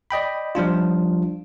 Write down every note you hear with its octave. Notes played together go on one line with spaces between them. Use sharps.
D5 D#5 G5 B5
F3 G3 D4 F4